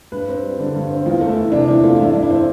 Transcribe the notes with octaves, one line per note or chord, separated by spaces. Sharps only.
G2 B4
C4
G3
D3
G2
C4
E2 F4
A3
E4
E3
C3 D4
E2 E4
A3 F4
G2 E4
D4
G2
E4
C4